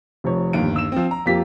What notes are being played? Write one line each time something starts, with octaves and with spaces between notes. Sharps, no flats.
F1 F2 C#5
G1 D#2 D7
E6 E7
F3 C4
A#5
F2 A#3 F4 G4 B6